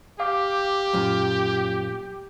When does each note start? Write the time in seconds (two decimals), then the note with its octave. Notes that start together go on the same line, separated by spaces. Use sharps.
0.20 G4 F5 D6
0.93 F#2 A#2